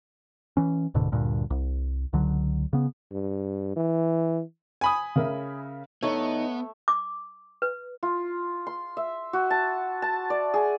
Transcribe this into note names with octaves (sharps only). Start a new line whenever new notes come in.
E3 C#4
D1 G#2 B2 D3
D2 G2 A#2
C2
C#2 D3 F#3
C#3 B3
G2
E3
G#5 B5 D#6
C#3 A#4 E5
E2 A3 B3 D#4 C#5
D6
B4
F4
C6
E5
F#4
A5
A5
D5
G#4